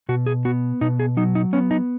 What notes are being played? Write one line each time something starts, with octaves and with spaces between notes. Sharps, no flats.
B2 F#4
G#4
B3 F#4
B2 D#4
G#4
F#3 D#4
D#4
B3 C#4
D#4